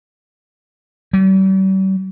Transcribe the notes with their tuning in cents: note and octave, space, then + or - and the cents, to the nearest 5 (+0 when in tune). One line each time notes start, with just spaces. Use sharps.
G3 -40